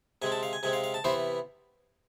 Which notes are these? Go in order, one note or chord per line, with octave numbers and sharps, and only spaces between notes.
C3 G#3 C4 G#5
A5
F5
G#5
C3 G#3 C4 G#5
F5
F5
A5
C3 E3 B3 E4 C5